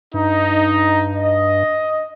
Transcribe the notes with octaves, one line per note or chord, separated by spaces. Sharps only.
G2 D#4
D#5